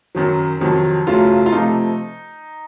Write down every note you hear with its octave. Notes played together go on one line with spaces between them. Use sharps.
F#2 D#3 F#3
F2 C3 D#3 F#3
F#2 C#3 F#3 A3 F4
F4
C3 F3 A3 D#4